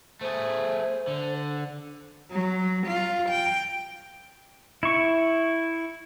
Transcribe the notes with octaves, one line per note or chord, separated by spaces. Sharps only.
A3 G#4 C5
D3
F#3
F4
G5
E4 C#6